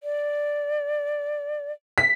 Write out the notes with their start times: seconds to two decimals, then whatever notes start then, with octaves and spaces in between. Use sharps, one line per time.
0.03 D5
1.98 B6